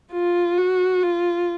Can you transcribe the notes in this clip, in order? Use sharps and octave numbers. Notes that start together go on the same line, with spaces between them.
F4
F#4
F4